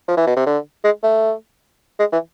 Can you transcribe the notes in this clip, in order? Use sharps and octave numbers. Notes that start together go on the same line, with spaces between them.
F3
E3
B2
C3
D3
G#3
A3
G#3
E3